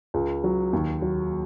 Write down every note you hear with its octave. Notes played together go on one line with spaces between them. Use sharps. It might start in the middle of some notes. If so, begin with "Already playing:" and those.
C#2
F#3
D#2
F#3